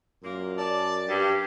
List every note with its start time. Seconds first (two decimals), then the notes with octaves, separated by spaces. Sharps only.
0.24 F#2 A#2 A#3
0.58 D5 A5
1.09 G2 G4